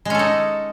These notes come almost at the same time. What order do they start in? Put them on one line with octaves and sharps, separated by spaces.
G#3 C#4 A4 D#4